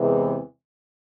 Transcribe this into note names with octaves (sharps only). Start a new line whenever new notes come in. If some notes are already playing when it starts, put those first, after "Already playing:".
Already playing: E2 C3 E3 G#3